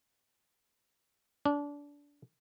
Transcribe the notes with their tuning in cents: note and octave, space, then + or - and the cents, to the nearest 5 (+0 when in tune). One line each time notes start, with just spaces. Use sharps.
D4 -25